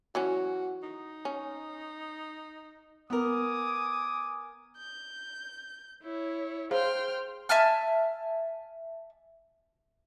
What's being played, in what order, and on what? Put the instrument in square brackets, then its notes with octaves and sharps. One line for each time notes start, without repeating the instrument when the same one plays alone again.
[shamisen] E3 F#3 C#4 [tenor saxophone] F#4
[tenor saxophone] D#4
[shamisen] C#4
[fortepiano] B3 A#4 [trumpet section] G#5 D6 D#6
[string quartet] G6
E4 C#5
[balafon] G#4 C5 F5 [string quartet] G5 C6 F6
[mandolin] E5 G#5 A5 F6